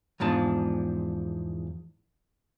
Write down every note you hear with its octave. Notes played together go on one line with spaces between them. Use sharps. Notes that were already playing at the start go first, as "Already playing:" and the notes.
E2 G#2 F3 D4 A5